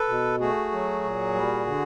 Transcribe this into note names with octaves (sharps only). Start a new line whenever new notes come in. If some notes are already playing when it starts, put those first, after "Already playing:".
Already playing: A4 B4
B2
A3 F#4 G#4
F#3
A#2
G3
D3